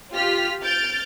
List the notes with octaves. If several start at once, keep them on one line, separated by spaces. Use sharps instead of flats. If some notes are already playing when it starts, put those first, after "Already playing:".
F4 G4 F6 B6
F6 G6 A6 D7